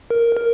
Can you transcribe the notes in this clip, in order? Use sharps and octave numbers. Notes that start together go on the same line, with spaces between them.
A#4
A#4